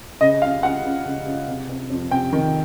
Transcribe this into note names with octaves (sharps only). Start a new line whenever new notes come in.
C#3 D#5
C#2 F5
C#2 F#5
C#2
C#2
C#2
C3
C3
F2
C3 G5
D#3